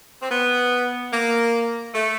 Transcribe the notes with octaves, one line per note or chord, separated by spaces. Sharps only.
C4
B3
A#3
A3